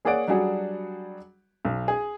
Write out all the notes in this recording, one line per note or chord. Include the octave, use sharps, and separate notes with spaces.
A#3 G#4 C#5 D5 F#5 D7
F#3 G3 D4 F#4 G#4
B1
G#4